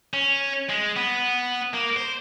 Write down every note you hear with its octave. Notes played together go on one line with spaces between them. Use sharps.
C#4
G#3
B3
A#3
C5